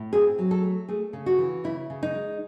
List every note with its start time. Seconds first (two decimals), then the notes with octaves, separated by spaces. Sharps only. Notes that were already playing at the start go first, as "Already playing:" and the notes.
Already playing: A2
0.13 C4 G#4
0.39 F#3
0.51 A4
0.64 A3
0.89 A3 G#4
1.13 C#3
1.26 F#4
1.39 E3
1.64 C#3 E4
1.90 C#3
2.03 D#4
2.15 G#3